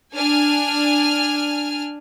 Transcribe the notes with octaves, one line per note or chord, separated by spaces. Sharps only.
D4 G#5 F6